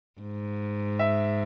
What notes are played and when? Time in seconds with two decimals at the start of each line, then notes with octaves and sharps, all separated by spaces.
0.21 G#2
0.99 E5